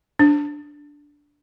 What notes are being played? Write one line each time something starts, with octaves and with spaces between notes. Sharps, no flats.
D4